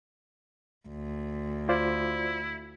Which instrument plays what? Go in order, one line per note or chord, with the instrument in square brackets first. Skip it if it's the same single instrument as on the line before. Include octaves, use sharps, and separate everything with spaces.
[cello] D2
[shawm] E4 [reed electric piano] F4 C5 D5